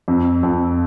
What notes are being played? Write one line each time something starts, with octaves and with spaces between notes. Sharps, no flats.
F2
F2